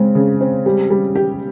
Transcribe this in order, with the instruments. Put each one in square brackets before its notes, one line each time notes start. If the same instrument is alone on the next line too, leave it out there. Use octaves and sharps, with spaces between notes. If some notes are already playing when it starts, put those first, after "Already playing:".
Already playing: [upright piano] C#3 C4 [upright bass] G#3
[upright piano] C#3
C4
G3
G3
G4